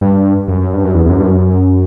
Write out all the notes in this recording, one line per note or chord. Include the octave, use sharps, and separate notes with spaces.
G2
F#2
G2
F#2
E2
E2
F#2
G2
F#2